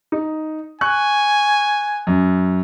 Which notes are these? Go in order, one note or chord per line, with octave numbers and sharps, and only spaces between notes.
D#4
G#5 C#6 F#6
F#2